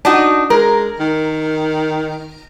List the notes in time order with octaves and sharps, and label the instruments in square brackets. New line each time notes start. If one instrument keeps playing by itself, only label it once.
[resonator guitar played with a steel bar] D4 D#4 F#4
[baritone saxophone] G#3 [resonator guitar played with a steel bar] A#4
[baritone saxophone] D#3